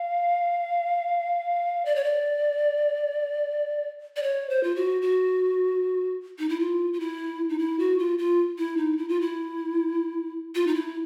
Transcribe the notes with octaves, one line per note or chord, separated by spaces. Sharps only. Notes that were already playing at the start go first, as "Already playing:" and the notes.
Already playing: F5
D5
C#5
D5
D5
C#5
C5
F4
F#4
F#4
D#4
E4
F4
F4
E4
D#4
E4
F#4
F4
F4
E4
D#4
E4
F4
E4
F4
D#4
E4